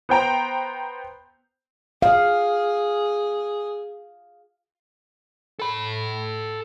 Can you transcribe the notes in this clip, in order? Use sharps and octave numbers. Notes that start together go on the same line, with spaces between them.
B3 C5 G5 A#5
G#4 F5
A4 B5